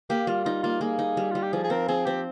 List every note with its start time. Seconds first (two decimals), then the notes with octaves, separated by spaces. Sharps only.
0.10 A#3 G4
0.27 G3 F4
0.45 D#4 F4
0.63 A#3 F4
0.81 A#3 G#4
0.99 D#4
1.17 G3
1.31 G3 F4
1.43 G4
1.53 F3 G#4
1.64 G#4
1.70 C4 A#4
1.88 C4 G#4
2.06 C4 G4